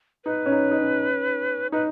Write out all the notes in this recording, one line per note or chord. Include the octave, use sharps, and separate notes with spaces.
D#4 B4
C#4
D#4
D#4
C#4
D#4 B4